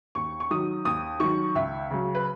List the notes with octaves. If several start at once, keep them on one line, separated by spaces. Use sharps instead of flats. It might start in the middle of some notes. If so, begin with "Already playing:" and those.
D#2 C#6
C#6
D#3 F#3 D#6
D#2 D#6
D#3 F#3 C#6
C#2 E5
C#3 F#3
B4